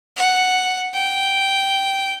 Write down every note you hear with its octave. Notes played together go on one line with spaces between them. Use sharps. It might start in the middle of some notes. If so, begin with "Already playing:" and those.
F#5
G5